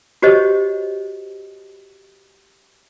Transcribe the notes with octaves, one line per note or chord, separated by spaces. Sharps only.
F#4 G4 C5 C#5 D#5